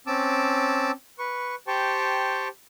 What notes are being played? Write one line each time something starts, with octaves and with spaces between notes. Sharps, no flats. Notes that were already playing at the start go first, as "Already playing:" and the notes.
C4 C#4 A5 D6 E6
B4 C#6
G4 C5 G5 A5 C#6